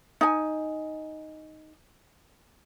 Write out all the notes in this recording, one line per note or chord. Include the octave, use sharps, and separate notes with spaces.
D#4 G#5